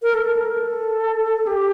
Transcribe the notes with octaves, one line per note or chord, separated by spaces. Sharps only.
A#4
A4
A#4
A4
G4